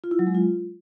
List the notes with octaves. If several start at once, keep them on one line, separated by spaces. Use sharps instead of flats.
F4
E4
F#3
G#3
F4